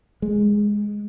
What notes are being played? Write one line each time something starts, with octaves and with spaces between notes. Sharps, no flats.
G#3